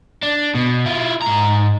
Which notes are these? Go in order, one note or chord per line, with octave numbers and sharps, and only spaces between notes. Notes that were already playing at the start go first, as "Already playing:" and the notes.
D4
B2
E4 F4
G#2 A#5